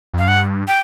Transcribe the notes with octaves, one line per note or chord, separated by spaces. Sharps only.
F2
F#2 F5
G2 F#5
G5